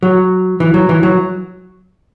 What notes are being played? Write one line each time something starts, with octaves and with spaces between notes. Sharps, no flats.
F#3
E3
F#3
E3
F#3